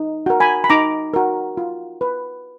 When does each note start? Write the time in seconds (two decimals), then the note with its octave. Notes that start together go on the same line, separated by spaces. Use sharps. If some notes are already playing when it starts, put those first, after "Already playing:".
Already playing: D#4
0.26 F#4 A#4
0.40 G#5 B5
0.64 B5
0.70 D#4 A#5 D6
1.14 F#4 A#4
1.57 F4
2.01 B4